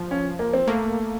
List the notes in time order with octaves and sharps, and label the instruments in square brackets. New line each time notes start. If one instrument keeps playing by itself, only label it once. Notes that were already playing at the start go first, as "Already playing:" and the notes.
Already playing: [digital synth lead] F3
[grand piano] C#4
A#3
C4
[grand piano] A3 [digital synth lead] A#3